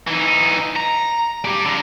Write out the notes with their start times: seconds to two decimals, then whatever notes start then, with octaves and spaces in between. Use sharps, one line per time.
0.07 E3 D#4
0.76 A#5
1.45 D4 G4
1.66 D3 A#4